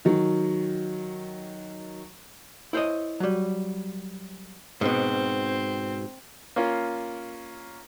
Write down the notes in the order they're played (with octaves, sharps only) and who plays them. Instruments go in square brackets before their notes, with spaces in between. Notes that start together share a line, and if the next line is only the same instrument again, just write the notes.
[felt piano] D#3 F#3
[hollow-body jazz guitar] E4 C5 C#5 D#5
F#3 G3
[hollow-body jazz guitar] G#2 B2 [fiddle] C4
[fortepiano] A#3 C#4 F4